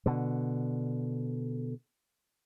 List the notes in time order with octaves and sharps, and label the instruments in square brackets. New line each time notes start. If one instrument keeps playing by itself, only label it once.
[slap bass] B2 D3